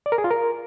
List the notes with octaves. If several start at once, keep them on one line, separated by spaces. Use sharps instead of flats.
D5
A#4
G#4
F4
A#4